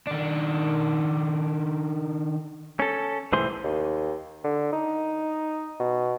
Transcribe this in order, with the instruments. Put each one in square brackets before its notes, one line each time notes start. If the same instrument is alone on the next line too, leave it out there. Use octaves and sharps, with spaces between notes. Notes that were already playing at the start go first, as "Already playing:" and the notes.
[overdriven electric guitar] D#3 D4
[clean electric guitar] C#4 A4
C2 A2 E3 G#4 C5 C6
[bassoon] D#2
D3
D#4
B2